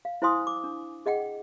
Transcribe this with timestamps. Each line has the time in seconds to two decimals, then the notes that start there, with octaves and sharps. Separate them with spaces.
0.05 F5
0.22 E4 C5 F5 G#5 C6 D#6
0.47 D6
0.64 D4
1.06 G#4 D#5 F#5 G5